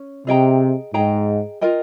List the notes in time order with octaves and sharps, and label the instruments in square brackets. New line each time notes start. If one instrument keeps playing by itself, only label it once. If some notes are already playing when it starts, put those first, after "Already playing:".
Already playing: [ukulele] C#4
[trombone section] C3 [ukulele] G#4 D#5 G5 A#5
[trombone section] G#2 [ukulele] G#4 D#5 G5 A#5
[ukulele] F4 A#4 D#5 G5